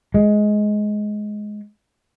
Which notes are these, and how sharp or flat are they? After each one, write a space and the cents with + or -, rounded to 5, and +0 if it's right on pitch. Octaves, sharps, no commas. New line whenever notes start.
G#3 +15